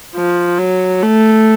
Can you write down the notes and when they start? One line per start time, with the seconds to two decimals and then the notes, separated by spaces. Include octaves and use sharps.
0.15 F3
0.59 F#3
1.03 A3